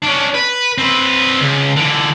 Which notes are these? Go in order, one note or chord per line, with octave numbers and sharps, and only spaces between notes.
C#4 D4
B4
C4 B4
C#2
D3 E3